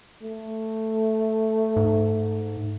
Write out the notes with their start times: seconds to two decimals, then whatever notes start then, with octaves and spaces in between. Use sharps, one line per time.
0.23 A3
1.76 G#2